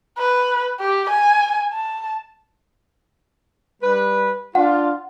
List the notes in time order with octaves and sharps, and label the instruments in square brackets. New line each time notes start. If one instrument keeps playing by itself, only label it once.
[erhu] B4
G4
G#5
A5
[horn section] G3 B4
[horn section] D4 F4 [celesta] F#5